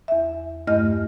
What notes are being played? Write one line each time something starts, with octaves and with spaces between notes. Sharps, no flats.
E2 E5
E2 G2 A3 D#5 F6